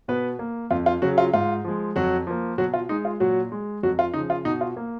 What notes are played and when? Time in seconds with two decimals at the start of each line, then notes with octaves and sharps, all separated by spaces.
0.08 B2 B3 B4
0.39 A#3
0.71 F2 F4
0.86 F4
1.02 C#3 F#3 F#4
1.18 F4
1.34 G#2 F4
1.64 F3 G#3
1.96 F2 F#3 F#4
2.27 F3 A#3
2.58 B2 F#3 F#4
2.74 F4
2.89 G#3 D#4
3.05 F4
3.20 A#2 F#3 F#4
3.52 G#3
3.83 F2 F#3 F#4
3.99 F4
4.14 C#3 F3 D#4
4.30 F4
4.45 B2 D#4
4.61 F4
4.77 A#3